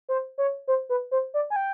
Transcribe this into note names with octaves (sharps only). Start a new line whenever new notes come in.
C5
C#5
C5
B4
C5
D5
G#5
G5